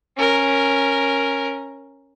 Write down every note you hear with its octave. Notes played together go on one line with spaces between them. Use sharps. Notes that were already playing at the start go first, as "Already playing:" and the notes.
C#4 A#4